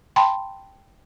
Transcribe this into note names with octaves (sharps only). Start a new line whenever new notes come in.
G5 A5 B5 C6